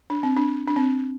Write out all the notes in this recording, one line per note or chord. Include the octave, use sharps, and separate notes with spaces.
D4
C4
D4
D4
C4